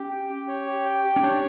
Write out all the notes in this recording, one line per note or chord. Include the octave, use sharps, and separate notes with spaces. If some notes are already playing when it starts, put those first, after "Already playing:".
Already playing: C#4 G4
G5
G4
C#5
G4
G5
G4
C#4
D4 C#5